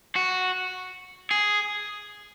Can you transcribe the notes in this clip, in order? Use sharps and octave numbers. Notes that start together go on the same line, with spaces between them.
F#4
G#4